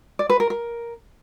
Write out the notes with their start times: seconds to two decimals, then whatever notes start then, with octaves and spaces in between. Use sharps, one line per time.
0.19 D5
0.29 B4
0.40 A#4
0.50 A#4